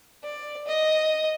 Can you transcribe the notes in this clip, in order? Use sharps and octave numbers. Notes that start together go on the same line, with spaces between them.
D5
D#5